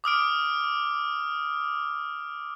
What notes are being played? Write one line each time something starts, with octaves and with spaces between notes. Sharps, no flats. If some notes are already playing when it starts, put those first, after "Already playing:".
D6 D#6 F6 D7